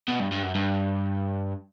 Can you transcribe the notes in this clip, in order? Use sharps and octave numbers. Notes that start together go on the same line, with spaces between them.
B2
G2
G2
F#2
G2